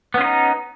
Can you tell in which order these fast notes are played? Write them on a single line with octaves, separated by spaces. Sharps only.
B3 C#4 F4 D#4